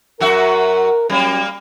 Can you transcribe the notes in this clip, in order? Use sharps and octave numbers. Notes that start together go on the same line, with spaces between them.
F#2 F#4 A#4 E5
F#3 G3 A#3 C#4